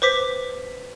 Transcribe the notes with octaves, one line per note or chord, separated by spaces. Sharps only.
B4 C5 D6 B6